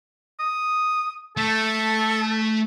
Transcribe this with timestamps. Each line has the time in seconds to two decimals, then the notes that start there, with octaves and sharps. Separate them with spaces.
0.40 D#6
1.37 A3 A4